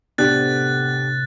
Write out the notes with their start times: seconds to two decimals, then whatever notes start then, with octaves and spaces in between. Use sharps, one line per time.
0.18 C2 A2 C3 B3 D4 G4 F#6 A6